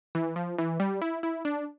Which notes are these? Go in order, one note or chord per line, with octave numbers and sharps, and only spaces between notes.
E3
F3
E3
G3
E4
E4
D4